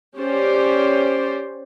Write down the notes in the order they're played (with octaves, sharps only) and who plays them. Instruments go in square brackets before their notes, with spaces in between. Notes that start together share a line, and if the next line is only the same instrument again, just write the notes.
[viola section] C#4 G4 C5 D5